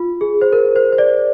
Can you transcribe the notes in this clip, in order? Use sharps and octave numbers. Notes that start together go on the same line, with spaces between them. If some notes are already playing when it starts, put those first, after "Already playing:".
Already playing: F4
G#4
C5
A#4
C5
C5
D5